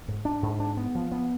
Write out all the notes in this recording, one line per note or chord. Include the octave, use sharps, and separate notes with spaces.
G#2
D4
G#2
D4
B3
F3
B3